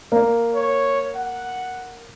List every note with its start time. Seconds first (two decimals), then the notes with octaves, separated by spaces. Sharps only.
0.12 A#3
0.55 C#5
1.16 F#5